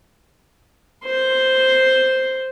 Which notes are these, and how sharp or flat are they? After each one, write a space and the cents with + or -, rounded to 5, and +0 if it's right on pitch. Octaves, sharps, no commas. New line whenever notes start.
C5 +0 C6 +0